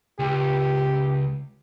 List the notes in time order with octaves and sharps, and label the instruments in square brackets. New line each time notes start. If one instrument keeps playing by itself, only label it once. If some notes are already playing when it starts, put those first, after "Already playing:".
[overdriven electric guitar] C#2 [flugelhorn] G4